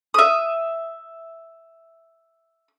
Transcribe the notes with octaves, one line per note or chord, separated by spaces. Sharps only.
E5 D#6